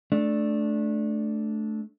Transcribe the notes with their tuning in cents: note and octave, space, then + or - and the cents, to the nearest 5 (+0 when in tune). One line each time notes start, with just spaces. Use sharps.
A3 -15 D4 +0